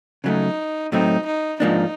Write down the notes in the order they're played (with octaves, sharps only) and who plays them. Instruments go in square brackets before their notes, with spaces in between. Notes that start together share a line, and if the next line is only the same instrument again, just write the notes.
[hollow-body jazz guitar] C#3 F#3 A3 [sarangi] D#4
[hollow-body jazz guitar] A2 F#3 A3 C4 [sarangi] D#4
[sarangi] D#4
[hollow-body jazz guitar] G#2 F3 A#3 D4 [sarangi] D#4